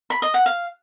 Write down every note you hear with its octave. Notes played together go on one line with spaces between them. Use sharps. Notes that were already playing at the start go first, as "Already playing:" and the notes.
B5
D#5
F#5
F5